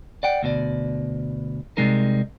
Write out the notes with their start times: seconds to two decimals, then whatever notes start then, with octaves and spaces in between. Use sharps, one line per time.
0.23 D5 F#5 G5
0.43 D2 B2 D5
1.77 C3 G3 G#3 D#4 A#4